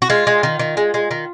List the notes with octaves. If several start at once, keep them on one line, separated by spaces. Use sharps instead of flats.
F#4
G#3 F4
G#3
D#3
D#3
G#3
G#3
D#3